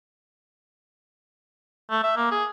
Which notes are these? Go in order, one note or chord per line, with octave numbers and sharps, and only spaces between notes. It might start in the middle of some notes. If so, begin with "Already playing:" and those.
A3
E5
A#3
G#4